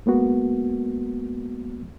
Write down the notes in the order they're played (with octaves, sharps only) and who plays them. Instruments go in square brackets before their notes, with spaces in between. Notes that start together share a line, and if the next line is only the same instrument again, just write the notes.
[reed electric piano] G#3 A#3 B3 F#4